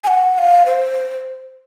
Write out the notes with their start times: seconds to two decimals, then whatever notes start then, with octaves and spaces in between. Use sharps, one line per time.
0.04 G#5
0.07 F#5
0.34 F#5
0.38 F5
0.66 C5